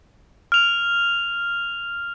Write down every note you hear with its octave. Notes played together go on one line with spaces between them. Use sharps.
F6 F7